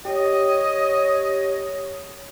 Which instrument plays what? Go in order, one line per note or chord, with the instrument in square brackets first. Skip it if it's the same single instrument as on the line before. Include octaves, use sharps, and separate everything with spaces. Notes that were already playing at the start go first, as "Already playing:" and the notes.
[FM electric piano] G4 [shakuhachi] C#5 [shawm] D#5